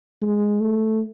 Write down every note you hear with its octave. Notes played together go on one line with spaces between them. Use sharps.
G#3
A3